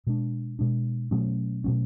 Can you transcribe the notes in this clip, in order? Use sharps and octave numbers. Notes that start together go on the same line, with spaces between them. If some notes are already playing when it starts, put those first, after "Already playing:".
B2 G#3 D4
B2 G#3 D4
B2 F#3 A3 C#4
B2 F#3 A3 C#4